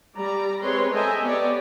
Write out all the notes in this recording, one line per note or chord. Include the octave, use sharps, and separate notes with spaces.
G3 D5 A#5
G#3 C4 B4 C#5 C6
A4 D#5 E5 G5 G#5 A#5
B3 G4 C#5 D5